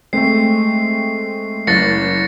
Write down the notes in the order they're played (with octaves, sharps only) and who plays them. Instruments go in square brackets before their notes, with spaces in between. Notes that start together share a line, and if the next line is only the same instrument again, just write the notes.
[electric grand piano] G#3 A3 [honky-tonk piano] C4 [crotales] C7
[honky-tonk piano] F#1 [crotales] A6 A#6 C#7